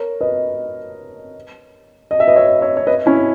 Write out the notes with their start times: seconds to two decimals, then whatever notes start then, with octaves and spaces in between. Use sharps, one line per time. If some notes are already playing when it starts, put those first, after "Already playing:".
Already playing: A#4 C#5
0.21 B4 D#5
2.11 D#5
2.20 E5
2.27 B4 D#5
2.36 C#5 E5
2.61 C#5 E5
2.77 C#5
2.87 B4 D#5
3.06 C#4 E4